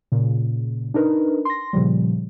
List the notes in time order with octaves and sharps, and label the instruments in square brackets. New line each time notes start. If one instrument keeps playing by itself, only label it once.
[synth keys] A#2 C#3
D4 D#4 A#4 B4
C6 A#6
A#2 C#3 F3 G3